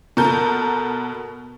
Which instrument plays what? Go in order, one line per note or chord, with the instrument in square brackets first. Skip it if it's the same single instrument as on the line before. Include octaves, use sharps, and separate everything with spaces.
[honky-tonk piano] B2 A4 A#4 G6